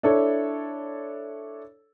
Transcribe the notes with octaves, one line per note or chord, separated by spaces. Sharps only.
D4 E4 A4 C#5